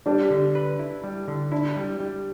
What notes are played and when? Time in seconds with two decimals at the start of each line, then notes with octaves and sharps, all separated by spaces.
0.06 G3 D4 G4
0.30 D3
0.55 B4
0.79 E4
1.04 G3
1.28 D3
1.52 D4 E4
1.76 G3
2.00 G3